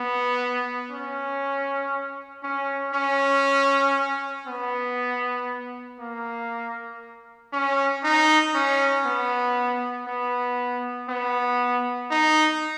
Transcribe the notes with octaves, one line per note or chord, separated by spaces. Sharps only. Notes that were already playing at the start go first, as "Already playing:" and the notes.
Already playing: B3
C#4
C#4
C#4
B3
A#3
C#4
D#4
C#4
B3
B3
B3
D#4